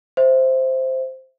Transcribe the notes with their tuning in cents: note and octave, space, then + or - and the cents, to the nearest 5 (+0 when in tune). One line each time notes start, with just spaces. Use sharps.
C5 +0 E5 +0